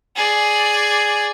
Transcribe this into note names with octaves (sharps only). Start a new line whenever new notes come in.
G#4 D5